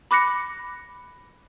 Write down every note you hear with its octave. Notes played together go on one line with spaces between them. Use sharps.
B5 D6 F#6 A#6 C#7